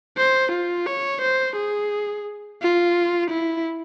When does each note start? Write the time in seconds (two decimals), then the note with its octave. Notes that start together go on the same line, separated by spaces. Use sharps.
0.17 C5
0.52 F4
0.87 C#5
1.21 C5
1.56 G#4
2.61 F4
3.30 E4